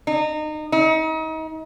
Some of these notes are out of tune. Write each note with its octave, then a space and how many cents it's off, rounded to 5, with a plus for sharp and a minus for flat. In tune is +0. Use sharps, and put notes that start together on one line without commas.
D#4 -25
D#4 +35